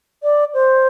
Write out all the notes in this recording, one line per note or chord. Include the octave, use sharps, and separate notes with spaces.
D5
C5